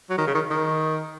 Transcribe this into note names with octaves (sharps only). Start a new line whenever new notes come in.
F#3
D#3
C#3
D#3
D#3